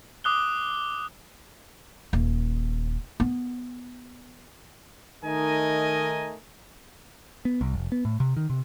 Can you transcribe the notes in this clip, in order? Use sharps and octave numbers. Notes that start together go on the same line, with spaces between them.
D6 D#6 F#6 G7
D#1
B3
D#3 A3 D#4 A#4 D#5 G#5
B3
C2
F1
B3
A2
C3
D#3
C3